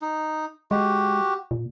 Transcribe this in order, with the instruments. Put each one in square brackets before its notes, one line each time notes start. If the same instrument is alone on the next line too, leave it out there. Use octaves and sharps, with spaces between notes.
[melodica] D#4
[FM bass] G#3 [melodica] F#4 G4
[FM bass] A#2